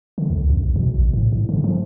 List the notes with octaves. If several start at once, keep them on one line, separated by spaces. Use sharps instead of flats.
D3
C#2
F#2
B1
B2
A#1
A2
G#2
D3
F3